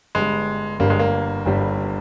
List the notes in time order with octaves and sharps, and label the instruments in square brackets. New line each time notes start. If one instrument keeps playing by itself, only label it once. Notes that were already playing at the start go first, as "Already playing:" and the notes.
[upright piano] G1 G2 G3 [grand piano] G#3
[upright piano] G1 G2 G3 [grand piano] A#3
[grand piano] G#3
A#3
[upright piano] G1 G2 G3